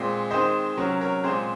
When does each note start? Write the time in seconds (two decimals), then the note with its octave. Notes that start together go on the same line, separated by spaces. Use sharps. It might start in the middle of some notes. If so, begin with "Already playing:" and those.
Already playing: A#2 G#3 C4
0.31 D#3 G#3 C4 C5 D#5
0.78 C3 F#3 C#4 A#4 C#5
1.01 A#4 C#5
1.24 A#2 G#3 C4 G#4 C5